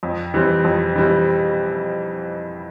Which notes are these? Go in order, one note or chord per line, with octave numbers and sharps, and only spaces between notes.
F2
E3 G3 C4
F2
E3 G3 C4